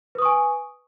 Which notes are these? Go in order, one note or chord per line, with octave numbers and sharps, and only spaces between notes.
B4 G#5 C#6 D#6